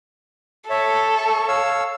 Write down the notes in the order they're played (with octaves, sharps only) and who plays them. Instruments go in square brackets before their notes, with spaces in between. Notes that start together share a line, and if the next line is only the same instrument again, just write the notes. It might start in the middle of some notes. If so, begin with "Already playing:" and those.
[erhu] A4 [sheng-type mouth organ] C#5 E5
[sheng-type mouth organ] C#6
C#5 F5 E6